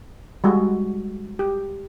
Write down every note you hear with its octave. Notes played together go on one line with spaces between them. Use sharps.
G3 G#3 F#4
G4